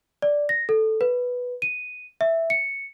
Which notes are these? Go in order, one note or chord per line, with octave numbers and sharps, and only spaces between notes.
D5
A#6
A4
B4
D#7
E5
C#7